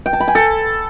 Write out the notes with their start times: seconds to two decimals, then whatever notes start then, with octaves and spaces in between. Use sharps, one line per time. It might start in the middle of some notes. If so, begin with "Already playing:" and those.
0.06 G5
0.13 A5
0.20 B5
0.28 G#5
0.35 A4